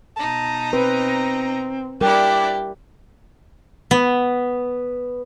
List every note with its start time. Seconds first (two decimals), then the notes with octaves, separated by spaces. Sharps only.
0.17 B2 D#4 A5 A#5
0.73 C4 B4
2.01 G3 D4 E4 G4 A#4 D5
3.91 B3